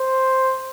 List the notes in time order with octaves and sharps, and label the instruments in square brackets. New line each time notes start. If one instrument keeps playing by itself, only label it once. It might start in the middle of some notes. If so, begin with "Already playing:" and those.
Already playing: [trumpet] C5